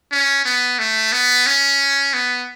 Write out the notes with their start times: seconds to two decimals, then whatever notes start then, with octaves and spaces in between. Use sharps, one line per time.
0.12 C#4
0.45 B3
0.79 A3
1.12 B3
1.47 C#4
2.14 B3